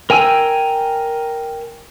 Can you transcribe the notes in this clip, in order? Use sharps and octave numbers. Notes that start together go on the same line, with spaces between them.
A#4 G5 G#5 E6